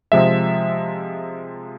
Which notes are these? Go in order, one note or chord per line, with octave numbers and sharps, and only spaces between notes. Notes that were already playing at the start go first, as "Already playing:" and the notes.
C3 F3 G#3 E5